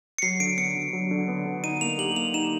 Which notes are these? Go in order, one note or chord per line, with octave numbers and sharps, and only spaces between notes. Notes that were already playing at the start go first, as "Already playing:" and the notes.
C#7
F#3 C7
D3 D7
B3 C#7
D3
F#3
D3
B3
D3
D#4 D#7
A#3 F7
G4 F#7
A#3 F7
D#4 E7